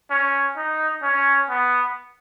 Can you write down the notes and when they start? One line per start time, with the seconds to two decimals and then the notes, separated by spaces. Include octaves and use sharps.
0.11 C#4
0.57 D#4
1.02 C#4
1.49 B3